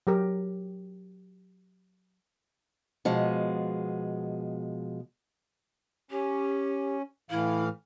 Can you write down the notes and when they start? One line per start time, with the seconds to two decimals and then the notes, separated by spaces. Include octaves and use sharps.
0.07 F#3 G4 A#4
3.05 B2 F3 G#3
6.11 C#4 G4
7.31 A2 E3 E4 F5